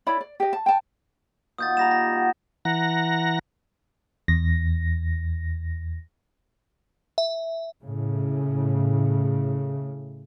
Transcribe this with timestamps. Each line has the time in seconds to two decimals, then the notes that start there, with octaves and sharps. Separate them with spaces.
0.07 E4 C#5 D5 B5
0.21 D5
0.40 G4 D#5
0.53 A5
0.66 G5 A5
1.58 A#2 D#3 F#4 D#6 G6 A6
1.77 G3 G4 A#5 A#6 E7
1.91 A#6
2.13 F#5
2.65 E3 F#5 A#5 A#6
4.28 E2 A#6
7.18 E5
7.84 A2 C#3